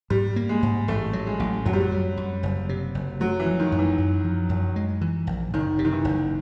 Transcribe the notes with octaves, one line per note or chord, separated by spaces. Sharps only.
G#2 G3
A#3
G#3
G#2
A1 A3
F#3
G#3
A1
F#2 F#3
G3
F#3
G3
F#2
F#1
C3
F#1
F#3 A3
E3
F3
D#3
F#2
E3
F#2
F3
F#2
G#3
E3
A#1
F#1 D#3
C3
D#3
E3
F#1